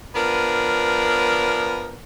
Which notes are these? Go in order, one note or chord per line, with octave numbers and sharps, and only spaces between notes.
F3 B3 D4 A#4